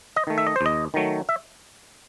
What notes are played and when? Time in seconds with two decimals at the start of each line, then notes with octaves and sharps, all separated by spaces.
0.16 D#5
0.27 D#3 A3
0.38 E5
0.47 D#5
0.56 C5
0.61 D#2
0.66 D#5
0.94 D#3 F#3 A3
1.29 E5